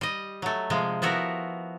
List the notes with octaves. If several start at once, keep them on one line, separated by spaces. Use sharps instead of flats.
G3 D#5
F#3 A3
C3 F3 G#3
F3 B3 E4 F#4 A#4